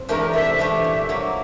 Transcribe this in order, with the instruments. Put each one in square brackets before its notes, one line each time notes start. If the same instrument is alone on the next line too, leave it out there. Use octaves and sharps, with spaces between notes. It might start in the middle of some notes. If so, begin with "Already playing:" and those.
Already playing: [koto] C4
[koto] E3 A3 D4 G4 [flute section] A#4
[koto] C3 [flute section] E5
[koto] E3 A3 D4 G4
[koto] A#2 [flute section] E5
[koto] F#3 A#3